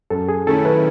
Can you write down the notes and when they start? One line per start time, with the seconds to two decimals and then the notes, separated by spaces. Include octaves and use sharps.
0.10 F#2 A4
0.29 G#4
0.47 D#3 A3 C#4 E4 A4
0.65 B4